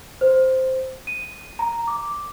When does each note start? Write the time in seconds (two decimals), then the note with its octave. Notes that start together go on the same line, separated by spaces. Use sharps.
0.21 C5
1.07 D#7
1.59 A#5
1.87 D6